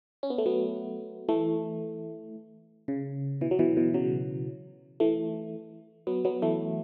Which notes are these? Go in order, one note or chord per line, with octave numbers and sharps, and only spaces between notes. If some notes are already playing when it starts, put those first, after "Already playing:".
C#4
B3
A3
F#3 B3
E3 A3
C#3
B2 E3
F#3
B2 E3
B2 E3
C#3 F#3
E3 A3
F#3 B3
F#3 B3
E3 A3